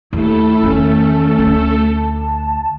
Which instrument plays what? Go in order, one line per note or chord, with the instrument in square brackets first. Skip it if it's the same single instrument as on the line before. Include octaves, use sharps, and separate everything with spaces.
[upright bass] D#2 [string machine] A3 A4 [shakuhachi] E4
[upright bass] E2 D#3 [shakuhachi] C#4
[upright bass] D2
[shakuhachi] A5